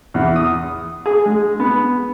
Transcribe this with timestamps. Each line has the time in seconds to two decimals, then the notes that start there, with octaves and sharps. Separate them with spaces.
0.14 E2
0.36 D#6
1.06 G#4
1.26 G#3
1.60 B3